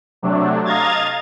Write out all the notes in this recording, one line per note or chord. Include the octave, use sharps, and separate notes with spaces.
C3 F#3 A3 D4
D#5 F5 A#5 G#6 A6